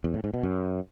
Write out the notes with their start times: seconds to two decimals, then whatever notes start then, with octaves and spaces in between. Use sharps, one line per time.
0.04 E2
0.14 A2
0.24 G#2
0.34 B2
0.43 F#2